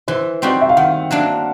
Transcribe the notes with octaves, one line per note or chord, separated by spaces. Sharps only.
E3 C5
G3 C4 D#4 F#4
E5
F5
D#3 F#5
F#3 A#3 D4